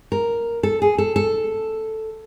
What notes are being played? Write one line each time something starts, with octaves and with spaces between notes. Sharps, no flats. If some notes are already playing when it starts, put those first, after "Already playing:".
A#4
A4
G#4
A4
A4